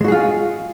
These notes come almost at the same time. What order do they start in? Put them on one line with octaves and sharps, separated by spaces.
G#3 F#4 G#4 F4